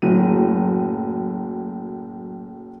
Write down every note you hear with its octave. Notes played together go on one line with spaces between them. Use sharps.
F#1 A2 F#3 D#7